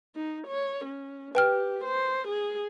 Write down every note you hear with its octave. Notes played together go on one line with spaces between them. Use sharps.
D#4
C#5
C#4
G4 B4 G5 F6
C5
G#4